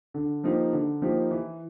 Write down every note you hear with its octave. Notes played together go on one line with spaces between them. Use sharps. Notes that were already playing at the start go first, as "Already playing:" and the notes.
D3
F3 A#3 D#4 G4
D3
F3 A#3 D#4 G4
E3